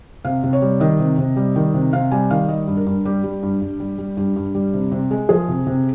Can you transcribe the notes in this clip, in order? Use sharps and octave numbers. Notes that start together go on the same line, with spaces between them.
C3 F5
C3
C#5
G3
D#3 D#5
C3
C3
G3
D#3
C3
C3 F5
G3 G#5
D#3 F5
G3 D#5
G2
A#4
G2
G3 G4
G3
G2
G2
G3
G3
G2 G4
G2
G3
C3
C3
G#3
F3 G#4
C3
C3